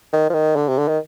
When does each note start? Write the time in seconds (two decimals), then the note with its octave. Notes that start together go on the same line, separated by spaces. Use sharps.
0.13 D#3
0.29 F3
0.34 D#3
0.56 D3
0.68 C3
0.78 D3
0.88 D#3